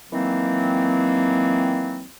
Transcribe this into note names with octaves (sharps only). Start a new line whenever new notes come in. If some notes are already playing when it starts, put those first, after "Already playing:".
D#3 E3 F#3 A#3 C4